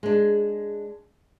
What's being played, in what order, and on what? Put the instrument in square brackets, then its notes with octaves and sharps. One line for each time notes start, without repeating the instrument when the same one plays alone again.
[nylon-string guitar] G#3 D4